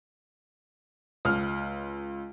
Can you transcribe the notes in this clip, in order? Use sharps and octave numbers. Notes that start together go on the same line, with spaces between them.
C#2 F6